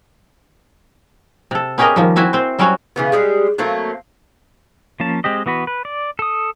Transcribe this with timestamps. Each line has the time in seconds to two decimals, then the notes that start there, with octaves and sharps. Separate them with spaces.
1.51 C3 A4
1.78 B3 C#4 G4 G#4 A#4 D#5
1.96 D#3 F3 G3
2.16 C4 E4 F#4 E5 G#5
2.33 C4 C5
2.59 F#3 G3 C4 C#4 F#4
2.96 C#3 E3 B3
3.12 G3 G#3 G4
3.58 F#3 A3 A#3 C4
5.00 F3 A#3 C#4 A5
5.24 G#3 C4 G4 D#5
5.46 E3 B3 F#4 B4
5.67 B4
5.85 D5
6.19 A4 D#6